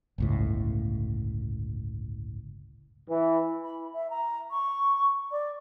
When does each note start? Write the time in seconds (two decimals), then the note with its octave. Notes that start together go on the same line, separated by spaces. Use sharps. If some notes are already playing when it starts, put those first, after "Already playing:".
0.18 G1 C#2 A2
3.09 E3
3.64 B5
3.93 E5
4.10 A#5
4.50 C#6
5.31 D5